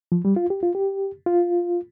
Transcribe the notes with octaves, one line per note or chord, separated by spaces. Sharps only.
F3
G3
F4
G4
F4
G4
F4